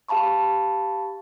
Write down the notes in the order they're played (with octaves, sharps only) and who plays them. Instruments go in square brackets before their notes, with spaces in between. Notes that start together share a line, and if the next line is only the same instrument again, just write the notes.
[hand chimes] G4 F5 A5 B5 C#6